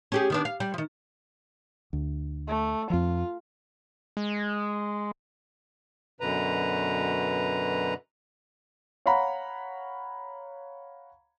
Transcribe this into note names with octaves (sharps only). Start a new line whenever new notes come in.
C#4 G4 G#4
D#3 B3 D4
F5
G3
D#3 F3
D2
A3
F2 F3 F4
G#3
F#2 B2 D3 B4 A#5
C#5 F5 F#5 A#5 B5